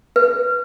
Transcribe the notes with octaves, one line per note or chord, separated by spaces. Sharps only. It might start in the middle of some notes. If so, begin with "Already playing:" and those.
B4